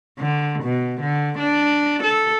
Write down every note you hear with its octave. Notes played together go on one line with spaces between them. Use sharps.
D3
B2
D3
D4
A4